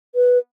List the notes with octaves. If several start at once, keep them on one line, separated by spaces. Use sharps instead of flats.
B4